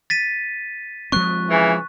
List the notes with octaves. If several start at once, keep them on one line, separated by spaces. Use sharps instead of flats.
A6 B6 D#7
F3 G#3 C4 C#6 F#6
C#3 E3